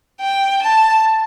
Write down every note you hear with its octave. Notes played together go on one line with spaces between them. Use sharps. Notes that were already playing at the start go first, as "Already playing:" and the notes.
G5
A5